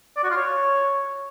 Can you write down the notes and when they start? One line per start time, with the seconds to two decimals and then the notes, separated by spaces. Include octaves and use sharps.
0.17 D5
0.23 F#4
0.30 F4
0.37 C#5